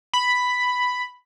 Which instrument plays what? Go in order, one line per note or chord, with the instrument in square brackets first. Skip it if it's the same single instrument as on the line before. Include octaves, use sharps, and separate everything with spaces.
[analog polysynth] B5